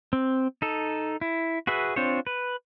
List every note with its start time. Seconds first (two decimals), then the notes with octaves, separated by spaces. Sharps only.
0.13 C4
0.62 D#4 A4
1.21 E4
1.67 F#4 G#4 B4 E5
1.96 C4 D4 F4 C5 C#5
2.27 B4